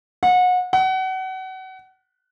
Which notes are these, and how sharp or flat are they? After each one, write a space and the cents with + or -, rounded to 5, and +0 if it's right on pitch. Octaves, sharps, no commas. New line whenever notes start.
F#5 -30
F#5 +30